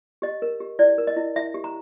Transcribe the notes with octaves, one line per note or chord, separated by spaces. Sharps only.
G4 D#5
A#4
G4
E4 D5
A#4
D#5
E4
E4 E5
G4
A#5